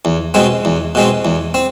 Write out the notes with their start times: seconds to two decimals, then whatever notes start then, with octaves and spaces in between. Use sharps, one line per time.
0.05 E2
0.34 B2 G#3 C4
0.65 E2
0.95 B2 G#3 C4
1.25 E2
1.54 C4